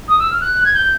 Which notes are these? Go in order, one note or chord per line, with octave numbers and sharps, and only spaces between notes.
D#6
E6
F6
F#6
G#6
G6